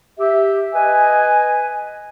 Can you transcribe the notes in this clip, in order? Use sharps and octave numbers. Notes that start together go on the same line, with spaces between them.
G4 E5
B4 D#5 G#5